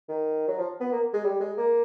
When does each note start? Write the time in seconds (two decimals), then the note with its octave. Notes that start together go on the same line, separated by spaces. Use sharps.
0.08 D#3
0.48 F#3
0.58 F3
0.80 B3
0.92 A#3
1.13 G#3
1.24 G3
1.41 G#3
1.57 A#3